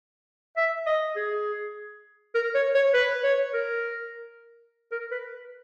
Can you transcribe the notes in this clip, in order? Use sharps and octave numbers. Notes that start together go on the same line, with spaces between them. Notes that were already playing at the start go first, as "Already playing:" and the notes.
E5
D#5
G#4
A#4
C#5
C#5
B4
C#5
A#4
A#4
B4